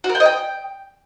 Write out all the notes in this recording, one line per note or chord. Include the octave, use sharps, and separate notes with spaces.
F#4
A#4
G5
D#5
G5